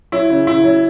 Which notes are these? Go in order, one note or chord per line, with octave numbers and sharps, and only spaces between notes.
F#3 E4
C#3
C#3 E4
F#3